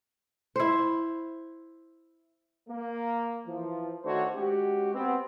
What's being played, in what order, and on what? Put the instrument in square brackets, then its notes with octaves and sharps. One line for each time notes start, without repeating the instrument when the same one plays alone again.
[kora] E4 C5
[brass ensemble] A#3
E3 F3
D#3 A3 D4 F#4 C5 C#5
G#3 C#4 F#4 G4
B3 C4